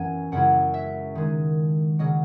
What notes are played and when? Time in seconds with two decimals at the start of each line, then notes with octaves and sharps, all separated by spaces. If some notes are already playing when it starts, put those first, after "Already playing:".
Already playing: F#2 E3 B3 E4 G#5 A#5
0.32 F#2 C#3 G#3 C#4 E4 F#5
0.74 E5
1.15 D#3 G#3 D#4
1.99 C#3 F#3 A#3 D#5